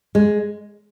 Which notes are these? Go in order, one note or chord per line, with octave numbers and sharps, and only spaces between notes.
G#3